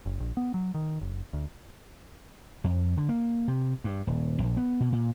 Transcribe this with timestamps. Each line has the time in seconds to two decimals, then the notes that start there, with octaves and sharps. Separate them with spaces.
0.06 F#1
0.20 A#1
0.37 B3
0.54 F#3
0.74 D#3
1.01 F#1
1.33 D2
2.64 F2
2.97 D3
3.09 A#3
3.48 C3
3.84 G2
4.07 D#1
4.43 A#1
4.57 B3
4.80 B2
4.92 A#2